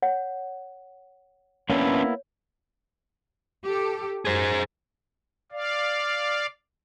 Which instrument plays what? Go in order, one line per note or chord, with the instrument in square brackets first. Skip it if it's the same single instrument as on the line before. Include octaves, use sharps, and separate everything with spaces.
[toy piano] C#5 F#5
[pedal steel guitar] A#3 B3 E4 [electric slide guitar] C#4 D4 B4 [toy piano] C#5
[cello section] G4 A4
[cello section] F#2 [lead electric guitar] G#4 C5
[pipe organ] D5 F5